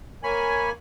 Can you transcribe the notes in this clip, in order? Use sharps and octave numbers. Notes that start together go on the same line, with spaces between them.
A#3 C#5 G#5 B5